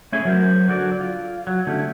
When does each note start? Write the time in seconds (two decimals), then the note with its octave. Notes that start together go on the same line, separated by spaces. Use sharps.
0.12 A3 C#4 E4 G#4 C#5 E5
0.25 F#3 A#4 C5
0.68 D3 F#3 F#4 D5
1.01 F4
1.47 F#3
1.67 D3 A3 C#4 E4 G4